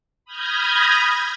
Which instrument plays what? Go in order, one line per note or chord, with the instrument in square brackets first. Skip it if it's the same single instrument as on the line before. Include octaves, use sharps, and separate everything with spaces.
[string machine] B5 D#6 F6 G6 G#6 A#6